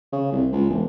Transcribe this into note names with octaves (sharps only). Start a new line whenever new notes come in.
C#3
C2
C#2
E1